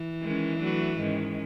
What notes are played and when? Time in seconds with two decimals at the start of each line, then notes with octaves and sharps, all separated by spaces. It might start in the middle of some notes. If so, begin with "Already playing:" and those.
Already playing: E3
0.21 D#3 G#3 C#4
0.59 F#3 A3 D4 F#4 B4
0.97 G#2 D#3 G#3 C#4